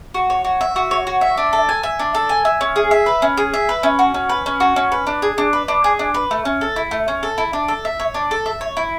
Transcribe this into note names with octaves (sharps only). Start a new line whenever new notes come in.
F#4
C#5
F#4
E5
F#4
C#5
F#4
E5
D4
A4
G#5
E5
D4
A4
G#5
E5
C#4
G#4
E5
B4
C#4
G#4
E5
B4
C#4
F#4
C#4
B4
C#4
F#4
C#4
B4
D4
G#4
D4
B4
D4
G#4
D4
B4
A3
C#4
A4
E4
A3
C#4
A4
E4
D4
A4
E5
C#5
D4
A4
E5
C#5
E4